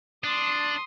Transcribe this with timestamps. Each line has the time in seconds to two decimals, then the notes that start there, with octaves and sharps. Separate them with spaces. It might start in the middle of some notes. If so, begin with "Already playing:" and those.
0.24 D4 C6 D#6